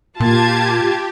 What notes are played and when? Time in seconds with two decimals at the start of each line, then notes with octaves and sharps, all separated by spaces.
0.20 A#2 A#3 F4 G4 A5 G#6